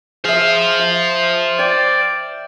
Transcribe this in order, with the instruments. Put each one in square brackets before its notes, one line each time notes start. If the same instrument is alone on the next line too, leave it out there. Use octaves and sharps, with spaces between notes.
[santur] G#4 E5 [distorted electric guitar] C5 F5
[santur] E5
[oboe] D5 [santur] G5